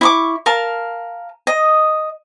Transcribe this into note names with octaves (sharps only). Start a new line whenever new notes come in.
E4 C#6 D6
A#4 F5 A5
D#5